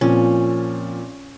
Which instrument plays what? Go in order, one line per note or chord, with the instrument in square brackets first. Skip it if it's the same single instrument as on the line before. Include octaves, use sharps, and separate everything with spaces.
[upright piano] A#2 F3 C4 [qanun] C#4